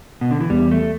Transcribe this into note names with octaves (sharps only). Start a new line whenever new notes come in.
B2
D3
E3
E2 G3
A3